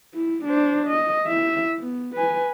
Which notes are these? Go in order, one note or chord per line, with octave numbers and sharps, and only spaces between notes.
E4
D4 C5
D#5
E4 E5
B3
B4 G#5